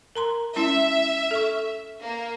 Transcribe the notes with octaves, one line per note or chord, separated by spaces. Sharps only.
A#4 A#5 C6
G#3 C#4 E4 E5
A4 C#6
A#3